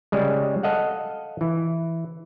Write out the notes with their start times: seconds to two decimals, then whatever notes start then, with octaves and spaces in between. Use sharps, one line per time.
0.12 C#3 G3 G#3
0.63 A4 D#5 F5 F#5
1.41 E3